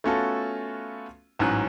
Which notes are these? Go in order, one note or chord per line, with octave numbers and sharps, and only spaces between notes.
A3 B3 C#4 F4 F#4 A4
A1 G#2 F#3 C#4 F#6